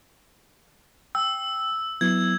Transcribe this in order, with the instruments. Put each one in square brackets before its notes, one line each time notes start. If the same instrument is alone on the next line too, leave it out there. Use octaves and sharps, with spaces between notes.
[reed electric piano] G5 [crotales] E6
[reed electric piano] F#3 B3 E4 [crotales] G#6